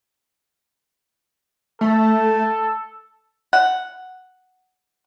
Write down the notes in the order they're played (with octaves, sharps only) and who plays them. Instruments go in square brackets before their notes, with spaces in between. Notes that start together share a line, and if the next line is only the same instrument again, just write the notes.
[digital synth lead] A3 [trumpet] A4
[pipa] F#5